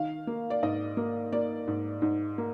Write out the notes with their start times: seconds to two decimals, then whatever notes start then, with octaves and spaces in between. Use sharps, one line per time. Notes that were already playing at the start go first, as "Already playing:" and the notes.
Already playing: D#3 F5
0.27 A#3
0.50 D5
0.63 G#2 D#5
0.97 A#3
1.32 A#3 D5
1.67 G#2
2.02 G#2
2.38 A#3